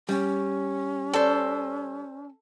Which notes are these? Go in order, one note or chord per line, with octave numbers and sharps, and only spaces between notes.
G3 C#4
A4 C5 D5